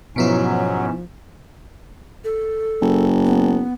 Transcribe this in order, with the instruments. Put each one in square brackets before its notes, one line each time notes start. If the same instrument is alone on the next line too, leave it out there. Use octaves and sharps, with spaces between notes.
[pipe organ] G#2 C#4 [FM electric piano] B2 B3 E4 [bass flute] F3 [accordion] F#3
[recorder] A4
[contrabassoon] F#1
[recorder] B3